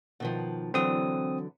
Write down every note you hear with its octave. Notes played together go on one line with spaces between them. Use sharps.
B2 D#3 F3
D3 E3 F#3 C4 D#6